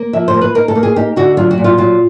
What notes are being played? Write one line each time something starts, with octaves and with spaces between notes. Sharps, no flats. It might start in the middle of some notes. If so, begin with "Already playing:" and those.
Already playing: A#3
F3 E5
C5
A#3
B4
D#4 A#4
A4
A#3
G#4
D#4 G4
D3 F#4
F#3 F4
F#4
A#2
F4
F#3 F4